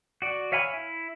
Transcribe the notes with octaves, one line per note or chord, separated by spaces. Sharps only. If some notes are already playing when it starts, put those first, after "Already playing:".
F#4 D5
C#5 E5 F5 G#5 B5
E4